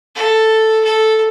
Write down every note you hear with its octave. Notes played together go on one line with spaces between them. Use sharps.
A4
A4